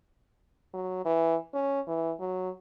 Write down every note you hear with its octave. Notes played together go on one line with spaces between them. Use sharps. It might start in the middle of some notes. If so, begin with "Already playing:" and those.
F#3
E3
C#4
E3
F#3